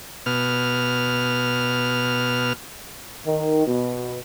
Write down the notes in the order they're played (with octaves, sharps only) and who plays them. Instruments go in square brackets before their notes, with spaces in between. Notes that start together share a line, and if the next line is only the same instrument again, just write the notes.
[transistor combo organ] B2 F6
[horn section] D#3
B2